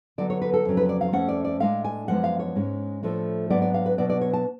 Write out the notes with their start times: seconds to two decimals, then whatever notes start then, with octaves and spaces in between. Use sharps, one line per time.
0.18 D3 F#3 B3 D5
0.30 C#5
0.42 B4
0.54 A4
0.66 F2 C#3 F#3 C#4
0.77 B4
0.89 D5
1.01 F5
1.12 F2 F3 A3 C#4 F#5
1.28 D5
1.44 D5
1.60 A2 G#3 D4 F5
1.84 G#5
2.08 F#2 F3 G#3 B3 D4 F#5
2.24 F5
2.39 C#5
2.55 G#2 G#3 C#4
3.03 A2 F3 A3 D4
3.50 G#2 F#3 B3 D4 D5
3.62 D5
3.74 F5
3.86 B4
3.98 B2 F#3 B3 D4 D5
4.10 D5
4.21 C#5
4.34 A5